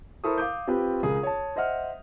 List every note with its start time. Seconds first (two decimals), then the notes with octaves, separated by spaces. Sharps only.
0.24 E4 A4 A#4 C5 C#6 D#6
0.38 F5 D6 G6
0.68 C4 F4 G4 B4
1.03 C#2 G#4 A#4 D#6
1.23 C#5 A5
1.56 C5 D#5 E5 F#5 F6